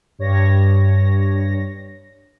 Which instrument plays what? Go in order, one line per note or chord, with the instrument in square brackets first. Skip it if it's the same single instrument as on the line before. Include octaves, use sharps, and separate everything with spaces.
[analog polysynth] G2 C#5 A#6